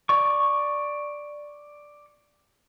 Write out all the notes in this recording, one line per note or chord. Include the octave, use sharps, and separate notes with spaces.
D5 C#6